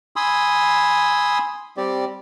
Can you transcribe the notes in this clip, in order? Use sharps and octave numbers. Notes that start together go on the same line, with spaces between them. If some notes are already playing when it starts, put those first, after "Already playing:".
G#5 B5 C6 D#6 E6
G3 C4 G4 D5